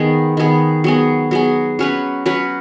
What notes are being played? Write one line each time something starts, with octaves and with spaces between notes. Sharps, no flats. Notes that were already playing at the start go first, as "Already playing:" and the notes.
Already playing: D#3 B3 G#4
D#3 B3 G#4
F#3 B3 G#4
F#3 B3 G#4
F#3 C#4 B4
F#3 C#4 B4